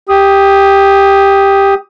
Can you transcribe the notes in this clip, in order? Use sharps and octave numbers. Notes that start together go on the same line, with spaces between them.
G4 D#6